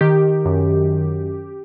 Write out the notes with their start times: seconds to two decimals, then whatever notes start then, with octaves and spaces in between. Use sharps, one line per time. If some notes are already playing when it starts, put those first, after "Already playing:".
0.01 D#3 G4
0.45 F#2